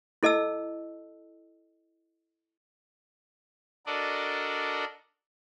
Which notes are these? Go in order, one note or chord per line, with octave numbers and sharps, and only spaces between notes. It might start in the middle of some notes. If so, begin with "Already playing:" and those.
E4 A4 D#5 A5 E6
D4 F#4 A4 A#4 D5 D#5